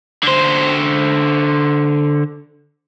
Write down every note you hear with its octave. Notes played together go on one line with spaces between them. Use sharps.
D3 C5